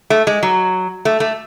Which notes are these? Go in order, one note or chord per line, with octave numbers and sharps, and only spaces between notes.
A3
G#3
F#3
A3
A3